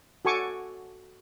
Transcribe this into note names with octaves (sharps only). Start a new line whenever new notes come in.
F#4 A4 G#5 C#6 D6